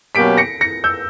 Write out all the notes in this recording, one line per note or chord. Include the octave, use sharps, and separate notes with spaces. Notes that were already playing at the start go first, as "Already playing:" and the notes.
B2 F#3 A#3 C#4 G4 B6 D7
A#6 C#7
A#6 C#7
E6 G6